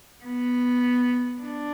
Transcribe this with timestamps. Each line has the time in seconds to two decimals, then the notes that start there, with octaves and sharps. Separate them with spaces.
0.25 B3
1.42 D4